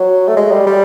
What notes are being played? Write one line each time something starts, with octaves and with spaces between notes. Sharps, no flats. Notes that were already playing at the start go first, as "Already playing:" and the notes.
Already playing: F#3
A3
G#3
G3
G3